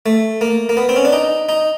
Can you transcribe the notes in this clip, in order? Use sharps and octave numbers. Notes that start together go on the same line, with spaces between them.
A3
A#3
A#3
B3
C4
C#4
D4
D#4
D#4